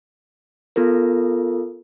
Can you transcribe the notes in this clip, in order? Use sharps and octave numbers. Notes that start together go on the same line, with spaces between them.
B3 F4 A4 A#4